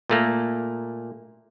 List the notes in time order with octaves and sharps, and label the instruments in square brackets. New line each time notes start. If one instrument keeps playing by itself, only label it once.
[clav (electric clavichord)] A#2 A3 A#3